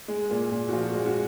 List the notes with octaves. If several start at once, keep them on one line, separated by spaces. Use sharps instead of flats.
G#3
A#2
A#2
F#4
F3 F4
F#4
G#3
F#4